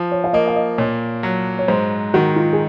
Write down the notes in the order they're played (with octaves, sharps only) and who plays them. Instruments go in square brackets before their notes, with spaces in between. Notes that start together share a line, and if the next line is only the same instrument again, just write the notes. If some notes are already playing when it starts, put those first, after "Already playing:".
Already playing: [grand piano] F3
[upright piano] C#5
F5
[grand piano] A#3 [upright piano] D#5
[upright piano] F5
D#5
[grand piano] A#2 [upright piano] C#5
[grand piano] F#3
[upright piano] C#5
[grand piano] G#2 [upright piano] C5
[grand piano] D#3 [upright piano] F#4
[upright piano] F4
G#4